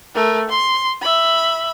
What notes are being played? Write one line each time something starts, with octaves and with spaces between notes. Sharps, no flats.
A3 A#4
C6
E5 B5